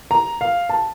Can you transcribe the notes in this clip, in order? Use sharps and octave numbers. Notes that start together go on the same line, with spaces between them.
A#5
F5
A5